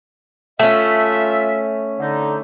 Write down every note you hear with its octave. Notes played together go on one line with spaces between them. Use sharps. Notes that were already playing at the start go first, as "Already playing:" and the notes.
A3 C#4 F4 E5
D3 D#4